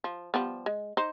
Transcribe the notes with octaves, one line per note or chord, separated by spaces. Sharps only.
F3
F3 G3 B3
G#3
D#4 C5